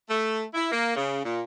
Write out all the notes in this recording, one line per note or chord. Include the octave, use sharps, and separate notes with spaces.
A3
E4
A#3
C#3
A#2